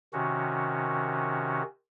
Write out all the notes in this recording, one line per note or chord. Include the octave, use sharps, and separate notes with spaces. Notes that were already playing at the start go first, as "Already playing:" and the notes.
C3 D#3 C#4 F#4